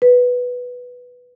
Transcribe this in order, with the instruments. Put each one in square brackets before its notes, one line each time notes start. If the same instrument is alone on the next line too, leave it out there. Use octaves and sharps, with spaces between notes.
[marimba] B4